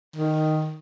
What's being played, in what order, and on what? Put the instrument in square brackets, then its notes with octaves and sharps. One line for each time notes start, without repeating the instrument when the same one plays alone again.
[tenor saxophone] D#3